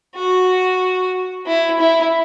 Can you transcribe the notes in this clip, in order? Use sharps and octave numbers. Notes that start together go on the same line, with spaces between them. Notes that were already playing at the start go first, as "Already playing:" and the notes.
F#4
E4
E4